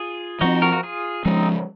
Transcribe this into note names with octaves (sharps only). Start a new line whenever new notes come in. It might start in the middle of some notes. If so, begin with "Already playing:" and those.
Already playing: F4 G#4
F3 C4 D#4 F#4
F#4 A#4
F#4
F4 G#4
F3 G#3 C4 C#4 D#4